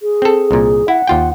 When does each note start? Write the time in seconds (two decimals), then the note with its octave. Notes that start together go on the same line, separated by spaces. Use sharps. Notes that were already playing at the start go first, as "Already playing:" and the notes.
0.02 G#4
0.22 C4 A4
0.51 C2 A#2
0.88 E4 F#5
1.07 D#2 F4 G5